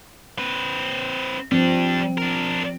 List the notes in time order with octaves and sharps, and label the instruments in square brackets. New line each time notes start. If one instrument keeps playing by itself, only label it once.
[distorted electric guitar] C4 B4
[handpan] F3 C4 [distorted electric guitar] G3 D4
[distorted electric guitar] D4 A#4